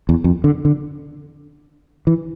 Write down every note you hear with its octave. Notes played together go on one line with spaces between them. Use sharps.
E2
F2
D3
D3
E3